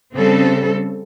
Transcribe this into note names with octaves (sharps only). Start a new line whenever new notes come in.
C#3 G3 C4 A4